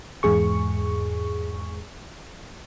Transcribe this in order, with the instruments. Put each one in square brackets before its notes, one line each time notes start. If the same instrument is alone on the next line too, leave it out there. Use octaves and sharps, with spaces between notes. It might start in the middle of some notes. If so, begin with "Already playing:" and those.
[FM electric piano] E2 G#2 G#4 C#6